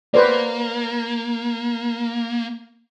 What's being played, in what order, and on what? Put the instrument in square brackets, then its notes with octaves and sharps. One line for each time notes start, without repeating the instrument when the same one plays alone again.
[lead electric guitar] A#3 [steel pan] B4 C5 D5